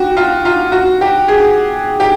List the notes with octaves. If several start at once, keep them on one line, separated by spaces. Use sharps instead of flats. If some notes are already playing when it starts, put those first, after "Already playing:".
Already playing: F#4 G4
F4
F4
F#4
G4
G#4
G4